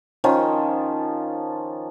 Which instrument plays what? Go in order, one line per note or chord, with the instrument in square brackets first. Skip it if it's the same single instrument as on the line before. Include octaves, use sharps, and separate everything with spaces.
[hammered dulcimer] D#3 F3 C#4